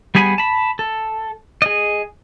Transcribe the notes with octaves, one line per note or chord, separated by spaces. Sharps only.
G3 B3 G#4 G#5 B5
A5 B5
A4
G#4 D#5